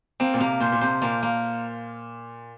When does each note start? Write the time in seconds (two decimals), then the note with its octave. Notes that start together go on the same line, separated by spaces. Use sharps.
0.20 A#3 C4
0.34 A#2
0.40 C3 A#3
0.60 A#2 C5
0.72 A#2
0.81 C3 C5
1.02 A#2 A#3
1.23 A#3